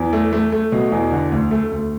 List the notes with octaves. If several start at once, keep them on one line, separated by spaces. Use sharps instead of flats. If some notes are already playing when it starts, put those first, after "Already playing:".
Already playing: E2
A3
A3
A3
B2
E2
D3
D2
A3
D2